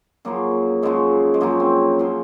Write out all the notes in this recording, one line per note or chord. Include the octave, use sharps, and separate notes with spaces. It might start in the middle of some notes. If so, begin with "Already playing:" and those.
F#2 C#3 F3 A#3
F#2 C#3 F3 G#3
G#3
F#2 C#3 F3 A#3
C4
C#3 F3